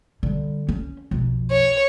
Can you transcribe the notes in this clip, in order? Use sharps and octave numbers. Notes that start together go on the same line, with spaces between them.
D3 G3
C#4
B1 F2
C#5